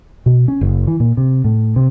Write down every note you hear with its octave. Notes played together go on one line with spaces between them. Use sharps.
B2
C#4
F#1
E3
A#2
C3
A2
C3